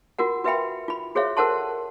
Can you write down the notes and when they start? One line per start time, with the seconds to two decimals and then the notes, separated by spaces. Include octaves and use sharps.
0.19 F4 F#4 A#4 F#5
0.44 F#4 B4 E5 F5 G5 B5
0.88 F4 B5
1.15 F#4 G#4 C5 C#5 E5 F5
1.37 A4 A#4 C5 F#5 A5 C6